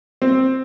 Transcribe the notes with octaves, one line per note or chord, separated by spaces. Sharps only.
C4